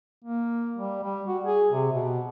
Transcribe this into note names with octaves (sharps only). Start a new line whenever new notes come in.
A#3
G3
G3
F#4
G#4
C3
B2